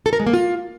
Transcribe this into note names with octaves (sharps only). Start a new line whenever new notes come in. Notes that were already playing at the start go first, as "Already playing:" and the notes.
A4
A#4
G#3
A#3
F4